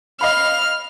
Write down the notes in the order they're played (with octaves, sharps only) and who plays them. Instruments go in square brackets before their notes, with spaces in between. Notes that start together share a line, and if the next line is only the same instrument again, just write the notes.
[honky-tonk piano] D#5 F5 B5 [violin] F6